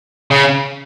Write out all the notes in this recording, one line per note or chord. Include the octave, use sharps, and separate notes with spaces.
C#3